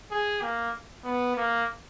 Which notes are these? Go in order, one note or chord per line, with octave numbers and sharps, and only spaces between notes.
G#4
A#3
B3
A#3